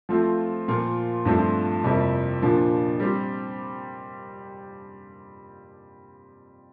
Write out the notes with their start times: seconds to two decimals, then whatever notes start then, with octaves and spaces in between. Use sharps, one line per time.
0.09 F3 A3 C4 F4
0.68 A#2 F3 A#3 F4 A#4
1.25 G2 F3 A3 C4 F4
1.84 F2 C3 G3 A#3 E4
2.42 A#2 F3 A#3 D4
3.00 G3 C4 G4